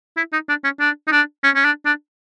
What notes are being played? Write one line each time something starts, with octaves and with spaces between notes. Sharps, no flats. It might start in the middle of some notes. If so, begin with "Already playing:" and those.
E4
D#4
D4
C#4
D4
D#4
D4
C#4
C#4
D4
D4